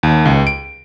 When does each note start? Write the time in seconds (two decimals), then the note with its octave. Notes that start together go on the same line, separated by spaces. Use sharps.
0.03 D#2
0.26 C#2
0.47 D7